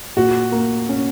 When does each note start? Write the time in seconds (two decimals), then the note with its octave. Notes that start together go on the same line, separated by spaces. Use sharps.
0.17 A#2 F#4
0.52 A#3
0.89 C#4